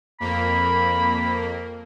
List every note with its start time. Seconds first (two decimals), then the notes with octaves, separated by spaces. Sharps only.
0.20 F2 A#3 B5